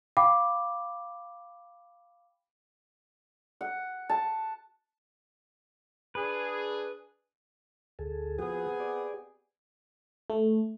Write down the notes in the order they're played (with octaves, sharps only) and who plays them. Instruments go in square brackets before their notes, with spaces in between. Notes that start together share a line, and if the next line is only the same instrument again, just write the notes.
[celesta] F5 G5 B5 D6
[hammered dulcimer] F#5
A5
[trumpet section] D4 G#4 [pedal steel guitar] B4
[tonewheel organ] D2 G#4 A4
[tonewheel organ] F3 F#4 [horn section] B3 C4 G#4
[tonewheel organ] G4 D5
[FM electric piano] A3